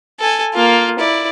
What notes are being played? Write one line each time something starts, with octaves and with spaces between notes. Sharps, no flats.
A4 G#5
A#3 F4
E4 D5